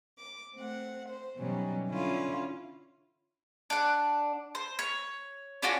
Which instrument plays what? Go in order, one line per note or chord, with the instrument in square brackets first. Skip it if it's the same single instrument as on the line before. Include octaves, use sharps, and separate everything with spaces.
[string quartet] D6
A3 C4 F#5
C5
B2 E3 F#3 G3 C#4 D#4
D3 C#4 E4 F4
[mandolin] D4 F#5
C5
C#5
C#4 D4 F4 F#4